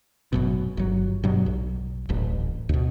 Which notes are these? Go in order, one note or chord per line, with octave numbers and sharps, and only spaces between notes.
G#1 F#2 B2
G1 F#3
G2 B2 F#3
B1
D1 A1
D2 B2